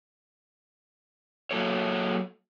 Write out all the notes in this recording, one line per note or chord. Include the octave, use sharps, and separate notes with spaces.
F#3 A#3 A4 C#5